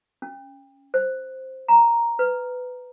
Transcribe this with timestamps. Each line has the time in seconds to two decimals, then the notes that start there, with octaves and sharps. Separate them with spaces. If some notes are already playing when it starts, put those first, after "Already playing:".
0.22 C#4
0.94 C5
1.68 A#5
2.19 B4